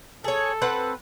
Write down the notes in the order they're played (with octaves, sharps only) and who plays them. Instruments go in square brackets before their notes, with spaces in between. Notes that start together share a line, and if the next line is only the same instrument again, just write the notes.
[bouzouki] G#4 C#5 [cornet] A4
[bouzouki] C4 B4 F#5